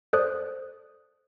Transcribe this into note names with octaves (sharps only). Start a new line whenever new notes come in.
A4 C5 D5 D#6 F#6